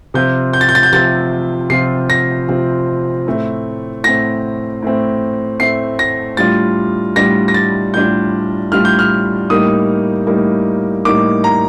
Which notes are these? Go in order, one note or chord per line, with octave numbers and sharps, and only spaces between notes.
C3 F3 C4 F4 G6
G6
A6
G6
A6
G6
C3 F3 C4 F4 A6
C3 F3 C4 F4 C7
A#6
C3 F3 C4 F4
A2 A3 C4
A2 A3 C4 A#6
A2 A3 C4
A2 A3 C4 C7
A#6
A2 G3 D4 F4 A6
A2 G3 D4 F4 A#6
A#6
A6
A2 G3 D4 F4 G6
A2 G3 D4 F4 F6
G6
F6
A2 G3 A#3 D#4 D#6
A2 G3 A#3 D#4
A2 G3 A#3 D#4 D6
A#5